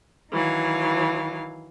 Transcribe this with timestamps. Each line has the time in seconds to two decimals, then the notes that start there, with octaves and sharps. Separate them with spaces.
0.33 D#3 E3 F#3 F5